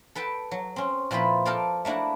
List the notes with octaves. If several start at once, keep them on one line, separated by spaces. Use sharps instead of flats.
A4 B4 G5 A5
F#3
C4 C#4
A#2 F3 C4 E4 B4 B5
A4 A#4 D5 F5 G5 A5
A3 A#3 D4 E4 F#4